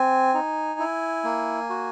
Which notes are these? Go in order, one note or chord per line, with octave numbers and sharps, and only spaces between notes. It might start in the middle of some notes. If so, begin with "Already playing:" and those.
Already playing: C4 G#5
D#4
E4
A#3
F#4